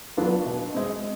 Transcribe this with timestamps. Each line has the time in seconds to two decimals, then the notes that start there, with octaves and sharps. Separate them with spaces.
0.17 F#3 B3 D4 F4
0.46 B2
0.74 G#3 C4